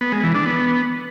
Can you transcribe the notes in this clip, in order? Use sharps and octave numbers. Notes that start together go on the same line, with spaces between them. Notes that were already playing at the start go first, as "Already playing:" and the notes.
B3
G#3
E3
D4
B3